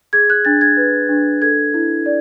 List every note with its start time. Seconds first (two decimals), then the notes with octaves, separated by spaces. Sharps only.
0.13 G#4 G#6
0.30 F#6
0.45 D4 A6
0.61 G#6
0.77 B4
1.09 D4
1.41 A4 G#6
1.74 E4
2.06 D5